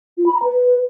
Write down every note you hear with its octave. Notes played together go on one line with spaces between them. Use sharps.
F4
B5
A#5
B4